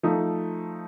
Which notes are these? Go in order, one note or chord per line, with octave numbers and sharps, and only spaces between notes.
F3 A3 D#4